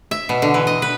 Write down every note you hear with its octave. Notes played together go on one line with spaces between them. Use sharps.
E5
B2
D3
E3
D#5
B4